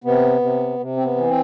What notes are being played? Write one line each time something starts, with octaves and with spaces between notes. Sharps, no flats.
C3 B3
C3
C3
C4
B3
E3
C4